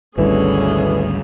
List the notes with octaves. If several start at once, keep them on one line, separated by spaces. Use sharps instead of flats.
G#1 D2 B2 D3 E3 G3 C#4 G#4